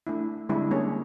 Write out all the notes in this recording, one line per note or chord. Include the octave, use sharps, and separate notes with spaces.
A3 D4 E4
D3 G3 G#3 C4 D4 E4
G3 A#3 C#4 D4 G#4 C#5